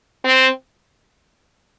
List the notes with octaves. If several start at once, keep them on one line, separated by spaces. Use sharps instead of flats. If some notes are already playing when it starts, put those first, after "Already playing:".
C4